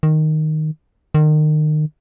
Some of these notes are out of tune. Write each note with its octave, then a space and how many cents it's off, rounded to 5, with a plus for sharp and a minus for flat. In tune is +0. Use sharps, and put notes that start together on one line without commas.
D#3 -5
D#3 -30